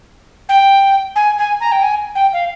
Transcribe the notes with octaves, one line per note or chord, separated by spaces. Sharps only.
G5
G#5
G#5
A#5
G5
G#5
G5
F5